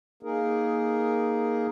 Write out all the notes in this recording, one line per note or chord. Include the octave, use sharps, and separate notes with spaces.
A#3 D#4 G#4 A#4